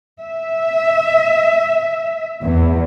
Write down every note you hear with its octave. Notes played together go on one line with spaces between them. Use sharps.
E5
E2